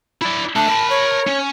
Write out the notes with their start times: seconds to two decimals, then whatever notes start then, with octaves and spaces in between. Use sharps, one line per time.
0.22 E4 D5
0.56 A3 D4 A5
0.68 A#4 B5
0.90 C#5
1.27 C#4